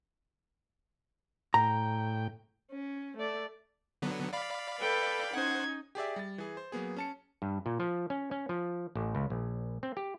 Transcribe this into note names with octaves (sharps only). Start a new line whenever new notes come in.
A2 G5 A#5
C#4
A3 D5
D3 F#3 B3
D5 F5 B5
A4 B4 G5
C#4 D#4 C5 F#5 G#6
G4 G#4 D5 E5
G3 A6
E3 G#4
C5
F#3 A#3 B3 G#4
C#4 A5 C#7
G2
A#2
F3
C#4
C#4
F3
A1
C#2
A#1
C4
G4